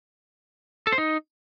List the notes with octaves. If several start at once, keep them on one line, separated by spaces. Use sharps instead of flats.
A4
C5
D#4